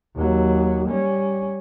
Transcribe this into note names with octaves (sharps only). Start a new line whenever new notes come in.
D#2 F#3
G3 C#4